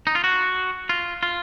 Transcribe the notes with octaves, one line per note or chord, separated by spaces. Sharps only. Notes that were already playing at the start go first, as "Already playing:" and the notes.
D#4
F4
F#4
F4
F4